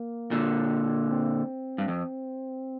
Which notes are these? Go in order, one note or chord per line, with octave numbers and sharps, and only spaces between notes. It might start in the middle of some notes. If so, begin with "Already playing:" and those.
Already playing: A#3
A#2 D3
C4
G2
F2